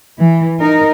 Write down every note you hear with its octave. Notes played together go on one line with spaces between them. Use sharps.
E3
D#4 A#4